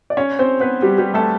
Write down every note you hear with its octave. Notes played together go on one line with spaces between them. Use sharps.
D5
C#4 C#5
C4 C5
B3 B4
G3 G4
G3 G4
A3 A4